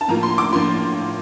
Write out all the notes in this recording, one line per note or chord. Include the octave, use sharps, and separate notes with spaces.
A5
A2 F3 A#3 F4 A#5
C6
D6
A2 F3 A#3 F4 C6